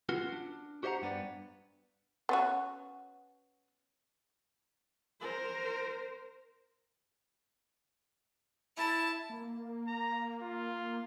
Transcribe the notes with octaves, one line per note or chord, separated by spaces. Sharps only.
B3 C#4 F4 F#4
D4
F#4 G4 C5 D#5 F#5 A#5
G2 B3 D4
B3 C#4 F#4
A#4 C5
E4 A5
A#3
A#5
F4